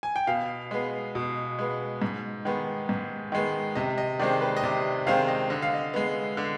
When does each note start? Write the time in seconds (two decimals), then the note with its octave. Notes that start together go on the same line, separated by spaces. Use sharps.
0.03 G#5
0.16 G5
0.27 B2 F5
0.71 G#3 B3
1.15 B2
1.59 G#3 B3
2.02 G#2
2.45 D#3 G#3 B3
2.89 G#2
3.32 D#3 G#3 B3
3.75 C3 D#5
3.98 D#5
4.20 D#3 G#3 C4 D5
4.41 B4
4.57 D#5
4.63 C3 D5
5.07 D#3 G#3 C4 F5
5.28 D#5
5.50 D3 D#5
5.62 F5
5.74 D#5
5.94 G#3 B3
6.37 D3